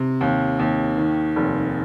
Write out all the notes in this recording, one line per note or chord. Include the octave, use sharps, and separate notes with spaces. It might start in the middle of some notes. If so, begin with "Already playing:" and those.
Already playing: C3
D#2
D#2
D#3
F1